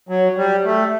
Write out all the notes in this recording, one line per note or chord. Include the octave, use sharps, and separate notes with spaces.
F#3
G3
A3